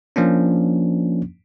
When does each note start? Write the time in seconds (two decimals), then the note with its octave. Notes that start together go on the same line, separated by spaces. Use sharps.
0.16 F3 A#3 C#4 D4